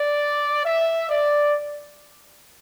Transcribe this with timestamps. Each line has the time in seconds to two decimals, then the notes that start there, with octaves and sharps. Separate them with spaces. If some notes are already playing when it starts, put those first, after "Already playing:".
Already playing: D5
0.65 E5
1.09 D5